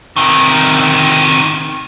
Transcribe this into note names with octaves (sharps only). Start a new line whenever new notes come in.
C3 D#3